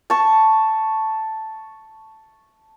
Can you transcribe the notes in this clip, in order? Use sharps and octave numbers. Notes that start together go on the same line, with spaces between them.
A5 C#6